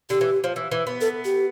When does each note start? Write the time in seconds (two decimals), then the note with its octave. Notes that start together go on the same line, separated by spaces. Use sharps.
0.10 D3 G4
0.21 E3
0.44 F3
0.56 E3
0.72 E3
0.87 B3
1.01 A4
1.25 G4